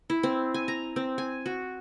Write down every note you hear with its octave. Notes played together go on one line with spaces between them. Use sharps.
E4
C4
G#5
A#5
C4
G#5
F#4